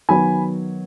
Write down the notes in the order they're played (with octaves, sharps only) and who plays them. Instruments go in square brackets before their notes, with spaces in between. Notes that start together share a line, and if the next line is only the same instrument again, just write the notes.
[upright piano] D#3 F#3 B3 G#5 B5